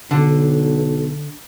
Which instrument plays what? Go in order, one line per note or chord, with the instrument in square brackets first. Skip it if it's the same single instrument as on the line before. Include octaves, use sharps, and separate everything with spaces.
[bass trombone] B1 [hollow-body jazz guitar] D3